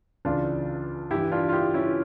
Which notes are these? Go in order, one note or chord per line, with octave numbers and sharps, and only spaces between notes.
C#2 C#3 E3 D4 F4
G2 E3 E4 G4
D4 F4
F4
E4 G4
C#4 E4